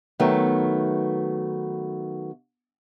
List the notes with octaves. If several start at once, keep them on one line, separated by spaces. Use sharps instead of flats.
D#3 F#3 A3 B3